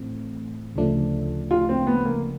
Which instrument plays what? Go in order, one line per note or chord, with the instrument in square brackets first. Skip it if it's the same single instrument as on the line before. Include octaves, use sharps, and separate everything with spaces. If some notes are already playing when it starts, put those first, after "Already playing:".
Already playing: [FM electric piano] A2 E3 A3 C4
D2 C#3 F3 A3 D4
[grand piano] F4
C4
B3
A#3